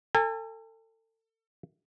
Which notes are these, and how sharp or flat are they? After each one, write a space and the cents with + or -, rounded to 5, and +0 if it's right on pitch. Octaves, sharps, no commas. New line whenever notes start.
A4 +35 G#5 -35